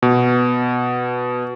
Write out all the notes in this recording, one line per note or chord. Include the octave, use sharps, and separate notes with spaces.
B2